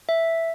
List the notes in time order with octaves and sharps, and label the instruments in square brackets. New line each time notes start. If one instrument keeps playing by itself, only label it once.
[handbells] E5